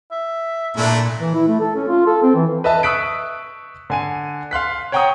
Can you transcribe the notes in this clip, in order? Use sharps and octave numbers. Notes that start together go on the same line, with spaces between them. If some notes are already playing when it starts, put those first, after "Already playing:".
E5
A#2 A3 D4 E4
E3
E4
A3
A4
C#4
F4
A4
C4
E3
B4 D#5 E5 A5
C#6 D#6 E6 F#6 B6 D7
D3 G#5 D#7
F5 C6 F#6 B6
C#5 F#5 G5 A#5 C#6 D#6